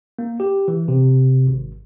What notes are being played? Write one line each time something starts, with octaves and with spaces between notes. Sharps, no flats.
A#3
G4
E3
C3
G#1